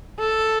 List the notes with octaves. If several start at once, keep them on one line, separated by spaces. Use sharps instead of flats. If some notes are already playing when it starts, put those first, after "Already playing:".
A4